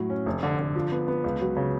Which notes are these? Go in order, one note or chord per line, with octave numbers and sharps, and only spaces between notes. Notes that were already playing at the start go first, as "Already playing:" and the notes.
Already playing: A2 F#3
C#4
F1
D3
D3
F3
B3
B3
C#2
F#3
C#3